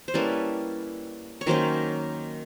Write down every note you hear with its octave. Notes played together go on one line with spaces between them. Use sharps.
C5
G3 A#3 C#4 E4 A4 B4
C#5
D#3 F#3 A#3 C#4 A#4 C5